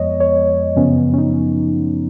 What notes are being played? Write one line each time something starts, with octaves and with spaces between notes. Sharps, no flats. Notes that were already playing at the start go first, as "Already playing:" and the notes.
Already playing: F2 F3 G#3 B3 C#5 D#5
C#5
F#2 C#3 F3 B3 C#4
C#4
D#4